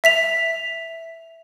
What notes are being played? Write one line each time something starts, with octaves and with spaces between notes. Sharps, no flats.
E5 B6 F7